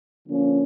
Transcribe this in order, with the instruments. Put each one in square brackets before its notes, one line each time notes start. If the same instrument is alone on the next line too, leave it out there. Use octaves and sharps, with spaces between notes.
[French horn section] D3 F3 A#3 C#4